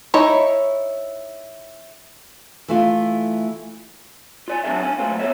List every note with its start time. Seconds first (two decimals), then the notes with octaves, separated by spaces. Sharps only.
0.14 D#4 E4 C#5
2.68 E3 A3 F4
4.48 F4 D5 G#5
4.64 F#3 C4 D4 G4 A4 E5
4.83 C#4 D4 G#5
4.98 F#2 A#2 F#3 A3 C4 F4
5.19 B3 A4 A#4 C#5 E5